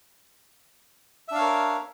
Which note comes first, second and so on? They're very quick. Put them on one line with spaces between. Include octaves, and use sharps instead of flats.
E5 D4 F5 C#5 A#4